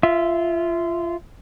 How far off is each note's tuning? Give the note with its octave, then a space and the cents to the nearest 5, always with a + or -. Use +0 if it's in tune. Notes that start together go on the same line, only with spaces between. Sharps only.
F4 -20 E5 +0